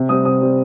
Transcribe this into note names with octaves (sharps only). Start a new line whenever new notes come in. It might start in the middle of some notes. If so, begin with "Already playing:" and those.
Already playing: C3
G3 C4 D#6
C3 D#6
G3 C4